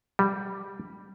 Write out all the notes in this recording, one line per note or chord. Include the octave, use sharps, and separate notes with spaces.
G3